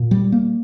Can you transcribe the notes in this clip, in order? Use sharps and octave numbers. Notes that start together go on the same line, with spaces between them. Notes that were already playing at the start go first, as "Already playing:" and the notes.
Already playing: A#2
G3
A#3